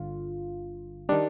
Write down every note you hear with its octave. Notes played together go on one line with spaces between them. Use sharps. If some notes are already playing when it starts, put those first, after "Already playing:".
Already playing: G1 G2 D3 F4
D#3 G3 D4